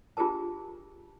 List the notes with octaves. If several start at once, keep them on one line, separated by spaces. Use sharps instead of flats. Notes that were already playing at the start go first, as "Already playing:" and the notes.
D4 F4 G4 G#4 A#4 A5